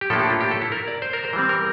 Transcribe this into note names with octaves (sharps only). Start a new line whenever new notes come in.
G4
A2 F3 A#3 D4 A4
G4
F4
G4
A4
E4
A#4
D5
C5
A#4
C5
E3 G3 C4
A#4